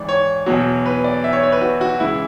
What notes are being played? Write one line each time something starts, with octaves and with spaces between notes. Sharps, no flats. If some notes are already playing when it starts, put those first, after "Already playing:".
Already playing: G#1 G#2 E3 D5
C#5
E2 B2 F#3
B4
D5
E5
C#5
C#5
B4
F#4
F#4
C#2 C#3 E3 E4